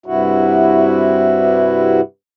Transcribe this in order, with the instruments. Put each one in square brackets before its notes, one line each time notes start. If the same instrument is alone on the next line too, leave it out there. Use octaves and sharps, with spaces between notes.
[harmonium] G2 C3 E4 F#4